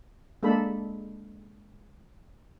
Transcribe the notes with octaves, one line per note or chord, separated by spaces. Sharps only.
G#3 A#3 D4 A4 B5